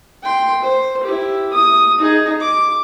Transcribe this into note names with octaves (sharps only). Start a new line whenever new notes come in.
G5 C6
C5
E4 G4
D#6
D#4 G#4
D6